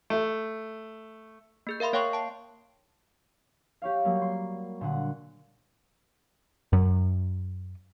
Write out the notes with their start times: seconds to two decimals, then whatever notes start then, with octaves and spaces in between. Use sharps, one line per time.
0.10 A3
1.67 A#3 G#4 G6
1.80 A#4 E5 F5 B5 C6
1.93 A#3 C#5 F5 G5 C6 C#6
2.13 G5 A5
3.82 G4 C#5 F5
4.05 F#3 G3 A#3
4.22 C6
4.81 A#2 D3 F#5
6.73 F#2